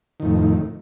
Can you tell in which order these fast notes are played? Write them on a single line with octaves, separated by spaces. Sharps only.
D#3 F2 A2